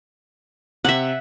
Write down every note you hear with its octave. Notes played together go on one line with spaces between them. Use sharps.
C3 E5 F#5